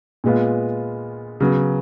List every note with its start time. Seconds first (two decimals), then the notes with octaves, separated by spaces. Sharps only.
0.24 A#2 G#3 B3 F4
1.40 C#3 F#3 B3